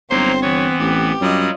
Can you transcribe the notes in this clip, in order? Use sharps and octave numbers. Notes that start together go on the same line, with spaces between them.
G1 F#3 A#3 C4 D#4 C5
E3 B3 C#5
A1 G4
F#2 F#3 G3 F4 D#5